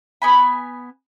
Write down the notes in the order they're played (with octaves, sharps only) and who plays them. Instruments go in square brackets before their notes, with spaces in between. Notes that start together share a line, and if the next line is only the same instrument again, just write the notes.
[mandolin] B3 G#5 B5